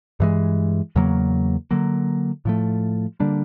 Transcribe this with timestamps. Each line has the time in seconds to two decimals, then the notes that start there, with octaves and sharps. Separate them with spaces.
0.20 G2 E3 G#3
0.96 E2 C#3 F#3 A#3
1.71 D3 F#3 A#3
2.45 A2 F3 A3
3.20 D3 G3 A#3 D4